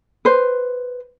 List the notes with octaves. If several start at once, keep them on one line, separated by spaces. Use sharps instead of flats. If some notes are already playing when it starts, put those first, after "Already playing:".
B4 C5